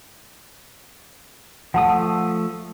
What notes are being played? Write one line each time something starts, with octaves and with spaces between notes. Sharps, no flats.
F3 A3 F#5 A5 D#6